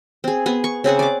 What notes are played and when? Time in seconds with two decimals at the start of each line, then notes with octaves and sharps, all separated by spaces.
0.24 C4 G#4
0.46 B3 G#4
0.64 C#6
0.84 C#3 C4 G#4 F#5
0.99 D5 D6